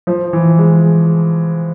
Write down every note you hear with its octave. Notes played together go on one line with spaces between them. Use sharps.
F3
E3
G#3